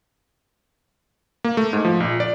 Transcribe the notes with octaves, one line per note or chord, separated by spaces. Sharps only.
A#3
A3
G#2
F3
A#1
D5